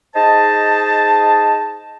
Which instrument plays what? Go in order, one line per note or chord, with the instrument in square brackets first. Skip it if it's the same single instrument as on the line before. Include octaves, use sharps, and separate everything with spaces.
[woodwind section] D#4 G#4 C5 D#5 A5